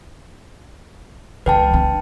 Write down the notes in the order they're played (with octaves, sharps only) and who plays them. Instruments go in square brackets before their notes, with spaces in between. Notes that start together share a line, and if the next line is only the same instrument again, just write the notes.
[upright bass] C#2 E3 [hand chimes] B4 G5 A5
[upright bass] D4